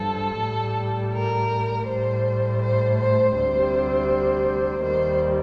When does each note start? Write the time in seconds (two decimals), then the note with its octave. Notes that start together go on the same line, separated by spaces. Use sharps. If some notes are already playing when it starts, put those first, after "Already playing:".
Already playing: G2 F3 A4
0.39 A2 G3
1.12 A#4
1.87 A2 G3 C5
2.61 C5
2.98 C5
3.35 D2 C3 G3 C5
4.83 D#2 D#3 G3 C5